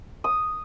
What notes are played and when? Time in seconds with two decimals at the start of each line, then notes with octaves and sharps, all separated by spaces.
0.24 D#6